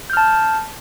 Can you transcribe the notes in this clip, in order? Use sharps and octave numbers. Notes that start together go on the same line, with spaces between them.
A5 F6 G6